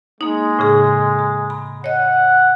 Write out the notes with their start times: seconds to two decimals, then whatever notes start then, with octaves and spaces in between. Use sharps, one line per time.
0.21 G#3 A#3 D#4
0.59 A2 C#3 G#4
1.19 A#5
1.50 B5
1.84 C#5 D#5 F#5